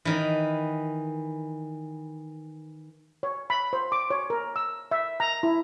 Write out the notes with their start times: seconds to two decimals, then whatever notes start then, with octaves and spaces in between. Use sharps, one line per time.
0.05 D#3 E3
3.23 C#5
3.50 B5
3.73 C5
3.92 D6
4.10 C#5
4.30 A#4
4.56 E6
4.91 E5
5.20 A#5
5.43 E4